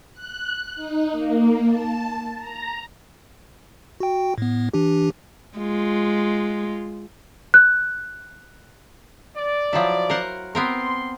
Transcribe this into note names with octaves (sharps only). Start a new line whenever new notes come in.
F#6
D#4
A#3
A5
A#5
F#4 G5
A2 B3
E3 D4 G4
G#3 F4
F#6
D5
F3 F#3 E4
A#4 C5 F#5
B3 C4 A#4 C6